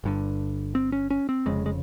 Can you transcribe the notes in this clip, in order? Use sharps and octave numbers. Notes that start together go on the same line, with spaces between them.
G1 G2 D3
C4
C#4
C#4
C4
F1 F2 C#3 G#3
G#3